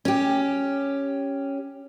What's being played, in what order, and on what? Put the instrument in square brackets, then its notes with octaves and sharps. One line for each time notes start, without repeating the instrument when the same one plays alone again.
[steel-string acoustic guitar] C#4 G4